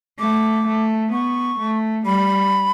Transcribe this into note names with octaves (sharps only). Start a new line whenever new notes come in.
A3 D6
A3
B3 C#6
A3
G3 B5